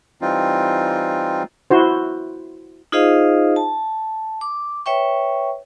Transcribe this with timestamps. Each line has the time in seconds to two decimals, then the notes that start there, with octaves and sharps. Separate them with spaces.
0.21 E3 G3 C4 D#4 F4
1.70 E4 F#4 C5
2.92 D#4 F4 G#4 C5 D#5 F5
3.56 A5
4.41 D6
4.86 B4 C#5 E5 G5 C#6